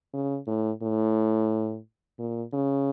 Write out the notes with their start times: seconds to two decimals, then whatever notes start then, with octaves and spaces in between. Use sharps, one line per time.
0.14 C#3
0.47 A2
0.82 A2
2.19 A#2
2.53 C#3